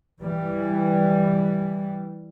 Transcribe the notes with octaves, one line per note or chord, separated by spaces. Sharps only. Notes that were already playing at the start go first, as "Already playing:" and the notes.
E3 G3